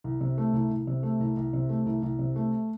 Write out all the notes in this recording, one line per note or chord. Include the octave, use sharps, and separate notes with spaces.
C2
C3
A3
C2
C2
C3
A3
C2
C2
C3
A3
C2
C2
C3
A3